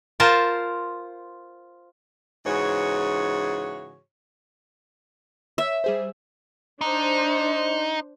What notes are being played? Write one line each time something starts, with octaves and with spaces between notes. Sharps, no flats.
F4 A#4 C5 A5
G#2 C#3 E3 F#4 G#4 C#5
C#5 E5 E6
G3 G#4 C5
D4 D#4 C5